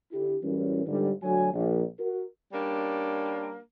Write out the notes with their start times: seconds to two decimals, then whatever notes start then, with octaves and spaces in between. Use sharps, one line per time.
0.12 D3 E4 G4
0.43 F#2 A2 E3 G3 C#4
0.86 G1 G#2 D3 G3
1.23 D2 F#3 G#5
1.53 A#1
1.98 F#4 A#4
2.53 G3 A#3 C#4 D4